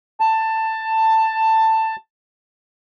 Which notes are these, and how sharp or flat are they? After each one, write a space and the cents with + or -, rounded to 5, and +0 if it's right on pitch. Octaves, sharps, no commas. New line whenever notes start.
A5 +15